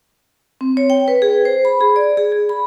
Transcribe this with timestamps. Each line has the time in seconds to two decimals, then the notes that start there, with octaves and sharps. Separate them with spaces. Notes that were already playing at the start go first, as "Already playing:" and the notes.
0.61 C4
0.77 C#5
0.90 G5
1.08 B4
1.22 G#4
1.45 C5
1.65 B5
1.81 G#4
1.96 D5
2.17 G#4
2.32 G#4
2.49 B5